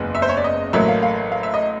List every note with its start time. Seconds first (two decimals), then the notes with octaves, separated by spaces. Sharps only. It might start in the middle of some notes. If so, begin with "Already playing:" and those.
Already playing: F#1 E2 C#3 E3 G#3
0.15 E5
0.22 C5
0.29 C#5
0.37 D5
0.44 D#5
0.73 A1 A2 F#3 A#3 E5
0.88 F5
1.03 F5
1.32 F5
1.43 E5
1.54 D#5